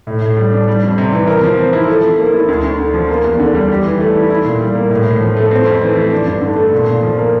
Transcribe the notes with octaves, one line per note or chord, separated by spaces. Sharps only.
A2
A2
G3
D4
G3
F2
C3
E3
A#4
F3
C4
E4
A4
F3
A#3
E4
D2
D2
D3
F3
A#3
E2
D3
G3
G4
E3
A3
E4
E4
A#2
G3
A#3
A2
A2
F3
A3
C4
F2
E3
A3
D4
G2
D3
A3
A#2
A#2
F3
A#3